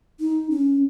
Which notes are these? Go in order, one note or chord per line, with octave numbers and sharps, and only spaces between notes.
D#4
C#4